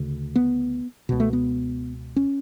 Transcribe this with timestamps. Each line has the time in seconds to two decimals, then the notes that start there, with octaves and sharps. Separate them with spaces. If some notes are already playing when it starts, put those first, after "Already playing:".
Already playing: D2 C#3
0.36 B3
1.09 C#2 B2
1.20 A3
1.33 B3
2.16 C#4